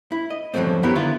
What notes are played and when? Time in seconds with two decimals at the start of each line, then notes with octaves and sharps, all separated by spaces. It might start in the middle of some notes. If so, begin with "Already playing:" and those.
0.12 E4
0.30 D#5
0.54 E2 G2 F3 F#3 A3 C4
0.83 F#2 B3 E4 G4 A#4 C#5
0.95 D3 D#3 B3 E4 F4